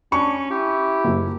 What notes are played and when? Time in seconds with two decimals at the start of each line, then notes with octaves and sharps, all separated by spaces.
0.12 C#4 D4 C#6
0.51 E4 G4
1.05 F#1